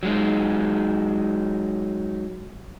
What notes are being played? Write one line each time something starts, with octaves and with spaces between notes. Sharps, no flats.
F#3 G#3 D#4